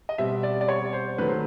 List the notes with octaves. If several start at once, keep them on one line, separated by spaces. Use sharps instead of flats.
D#5
B2 G3 C4 E5
D5
D5
C#5
C5
D#3 F#3 A3 B4
C5